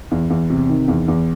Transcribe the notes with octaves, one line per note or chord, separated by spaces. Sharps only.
E2
E2
C3
D#3
E2
E2